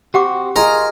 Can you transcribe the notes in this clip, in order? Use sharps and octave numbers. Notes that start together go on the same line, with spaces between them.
C4 F#4 G4 F#5 D6
F4 G#4 A#4 D#5 A#5